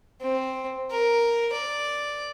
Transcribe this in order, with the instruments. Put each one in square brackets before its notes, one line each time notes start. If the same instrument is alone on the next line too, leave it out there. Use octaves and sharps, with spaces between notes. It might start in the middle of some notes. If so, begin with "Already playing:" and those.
[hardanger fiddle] C4
A#4
D5